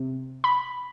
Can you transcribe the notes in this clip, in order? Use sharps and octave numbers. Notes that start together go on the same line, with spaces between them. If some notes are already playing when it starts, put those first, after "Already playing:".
Already playing: C3
B5